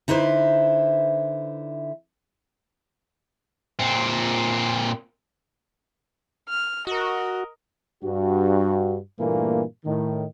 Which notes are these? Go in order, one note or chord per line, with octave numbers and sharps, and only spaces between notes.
D3 D#4 E4 B4 C5
A#2 C4
F6
F#4 A#4 D#5
G2 F#4
G2 A#2 E3 A3 A#3
A2 D#3